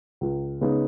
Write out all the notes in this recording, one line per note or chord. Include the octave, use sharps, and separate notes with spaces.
C#2
C#3 G#3 B3 D#4